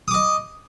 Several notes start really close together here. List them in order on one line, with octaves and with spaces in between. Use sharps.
D#6 D6 D#5